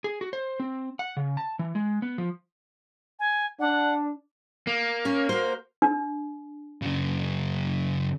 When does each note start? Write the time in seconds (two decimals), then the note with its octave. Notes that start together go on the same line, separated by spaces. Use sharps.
0.04 G#4
0.21 F#4
0.33 C5
0.60 C4
0.99 F#5
1.17 C#3
1.37 A5
1.59 E3
1.75 G#3
2.02 B3
2.18 F3
3.19 G#5
3.60 D4 F#5
4.67 A#3
5.05 C#4 C#5
5.29 F#4 C5
5.82 D4
6.82 F#2 C#3